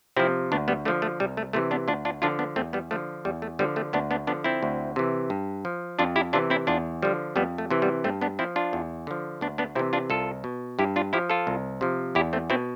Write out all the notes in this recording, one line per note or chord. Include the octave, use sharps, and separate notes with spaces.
C3 F3 C4 E4
D2 B3 D4
G3 B3
D3 F3 A3
A3
C2 G3
A3
C3 E3 A3
B3 D4
D2 D4 F4
D4 F4
D3 F3 D4 F4
B3 D4
E2 A3 C4
G3 B3
D3 F3 A3
E2 G3
A3
D3 F3 G3 B3
A3 C4
D2 B3 D4
B3 D4
D3 F3 B3 D4
C4 E4
D2
C3 E3
G2
F3
F2 D4 F4
E4 G4
C3 E3 D4 F4
C4 E4
E2 D4 F4
D3 F3 G3
F2 G3 B3
A3
C3 E3
G3 B3
G2 A3 C4
B3 D4
F3 C4 E4
D4 F4
E2
D3 F3
D2 B3 D4
B3 D4
C3 E3 C4 E4
D4 F4
C2 F4 A4
B2
G2 E4 G4
D4 F4
F3 E4 G4
F4 A4
C2
C3 F3
E2 E4 G4
A3 C4
B2 C4 E4